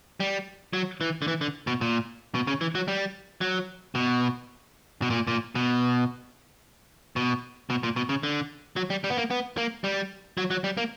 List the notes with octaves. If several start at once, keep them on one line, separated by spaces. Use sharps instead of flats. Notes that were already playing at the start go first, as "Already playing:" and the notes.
G3
F#3
E3
D3
E3
D3
B2
A#2
B2
C#3
E3
F#3
G3
F#3
B2
B2
A#2
A#2
B2
B2
B2
A#2
B2
C#3
D3
F#3
G3
G3
B3
A#3
B3
A#3
G3
F#3
F#3
G3
A#3